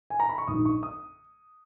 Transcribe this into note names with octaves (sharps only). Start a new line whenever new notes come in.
G#5
A#5
B5
C#6
A#1 G#2 D#3 F#3 D#6
C#6
D#6